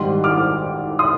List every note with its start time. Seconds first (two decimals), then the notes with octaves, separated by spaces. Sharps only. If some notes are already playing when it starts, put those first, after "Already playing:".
Already playing: G#1 G#2 D#3 G3 C6
0.24 D6 F6
0.99 C6 D#6